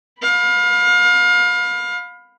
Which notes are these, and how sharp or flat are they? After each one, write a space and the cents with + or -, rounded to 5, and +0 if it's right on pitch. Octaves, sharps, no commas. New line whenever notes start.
F5 +30 B5 +0